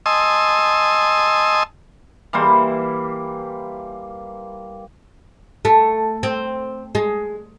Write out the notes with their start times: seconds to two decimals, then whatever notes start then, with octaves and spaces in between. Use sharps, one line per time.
0.06 D#5 G#5 A5 C6 D#6 E6
2.33 E3 G3 A#3 C5
5.65 A3
6.23 C4
6.95 G#3